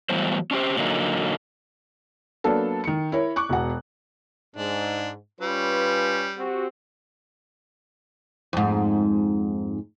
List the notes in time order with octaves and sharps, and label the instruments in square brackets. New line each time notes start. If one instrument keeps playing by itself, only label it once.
[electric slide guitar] A2 E3 F#3 G3 B3 C5
C#4 D4 G4 C5
A#2 D3 F#3 A#3 D#4
[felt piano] F#3 A#3 B3 D4 A4
D#3 C#7
E4 A#4 C#5
C#6 D6 F#6
E1 B2 F#5
[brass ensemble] G#2 [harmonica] D4
[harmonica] G3 [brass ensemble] C#4 F4 B4
[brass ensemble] C4 F#4 G4
[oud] F2 G#2